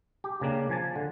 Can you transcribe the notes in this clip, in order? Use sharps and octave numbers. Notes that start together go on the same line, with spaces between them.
G4
C#3 A#3 D4
F3 G#5 A5
D3